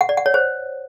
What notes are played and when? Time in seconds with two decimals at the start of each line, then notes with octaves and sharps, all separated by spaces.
0.01 F#5
0.09 D5
0.17 F#5
0.26 C#5
0.34 C5